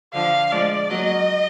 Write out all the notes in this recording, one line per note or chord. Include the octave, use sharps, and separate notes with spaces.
D3 F3 F5
F3 G#3 D5
F#3 A#3 D#5